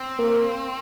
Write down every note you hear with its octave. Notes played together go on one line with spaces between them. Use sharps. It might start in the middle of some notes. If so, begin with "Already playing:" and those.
Already playing: C4
A#3